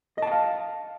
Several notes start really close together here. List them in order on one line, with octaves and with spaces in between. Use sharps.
D#5 A5 F#5 F5